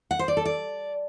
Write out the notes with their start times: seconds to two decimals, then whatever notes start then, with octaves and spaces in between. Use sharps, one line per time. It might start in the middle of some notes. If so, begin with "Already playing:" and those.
0.11 F#5
0.19 C5
0.28 D5
0.37 A4
0.45 D5